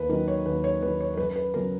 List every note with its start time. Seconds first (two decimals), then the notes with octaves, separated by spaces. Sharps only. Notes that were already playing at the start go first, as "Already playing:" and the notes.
Already playing: D#2 B4
0.09 D#3 F#3 A#4
0.28 C#5
0.46 D#2 B4
0.64 C#5
0.81 D#3 B4
0.85 F#3
1.00 C#5
1.14 A#4
1.17 F#2 B4
1.36 B4
1.54 C#3 F#3 A#4